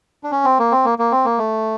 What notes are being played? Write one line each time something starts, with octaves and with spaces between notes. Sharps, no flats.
D4
C#4
C4
A#3
C4
A#3
A#3
C4
A#3
A3